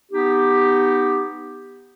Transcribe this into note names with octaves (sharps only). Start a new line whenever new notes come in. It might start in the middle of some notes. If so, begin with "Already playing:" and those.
B3 D#4 G4